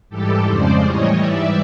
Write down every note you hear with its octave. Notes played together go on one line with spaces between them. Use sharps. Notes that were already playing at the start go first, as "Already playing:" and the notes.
G#2 E3 G3 G4 A4
F2 C#3 F3 G#3 C5 D5
A2 E3 G3 C#5 D#5
G#2 E3 G3 D5 E5